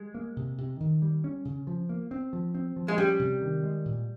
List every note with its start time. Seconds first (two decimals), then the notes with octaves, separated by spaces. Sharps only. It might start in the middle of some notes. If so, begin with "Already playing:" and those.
Already playing: G3 G#3
0.14 A#3
0.36 C3
0.58 C3
0.80 D#3
1.02 G3
1.24 C#4
1.45 C#3
1.67 F3
1.89 A#3
2.11 C4
2.33 F3
2.55 C4
2.76 F3
2.88 G#3
2.98 G3 C#4
3.19 C3
3.41 D#3
3.63 G#3
3.85 A#2